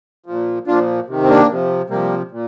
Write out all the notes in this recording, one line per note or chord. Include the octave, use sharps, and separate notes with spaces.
A#2 F3
A#2 F3 D4 F4
C3 D#3
C4
A#3 D4
C3 F3
C3 F3 G3 A#3
A#2